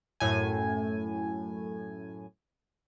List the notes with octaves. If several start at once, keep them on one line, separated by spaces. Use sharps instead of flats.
F#2 A2 G#5